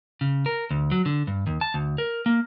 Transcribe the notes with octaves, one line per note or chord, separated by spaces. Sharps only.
C#3
A#4
D2
F#3
D3
G2
D#2
A5
D2
A#4
A#3